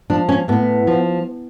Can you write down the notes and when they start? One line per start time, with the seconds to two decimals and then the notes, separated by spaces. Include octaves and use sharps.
0.10 F3 D4
0.29 C#4
0.48 A2 B3
0.87 F3